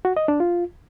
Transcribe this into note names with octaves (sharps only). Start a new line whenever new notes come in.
F#4
D#5
D4
F4